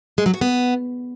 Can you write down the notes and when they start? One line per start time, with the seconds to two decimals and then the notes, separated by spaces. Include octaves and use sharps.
0.18 G#3
0.26 F#3
0.34 F#4
0.41 B3